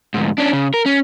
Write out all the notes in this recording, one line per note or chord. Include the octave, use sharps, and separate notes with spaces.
D2 G#2
C#4 D4
C#3
A#4
C#4